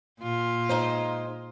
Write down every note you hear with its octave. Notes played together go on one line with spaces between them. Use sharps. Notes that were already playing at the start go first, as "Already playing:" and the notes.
A#2 F4
G#3 D#4 C5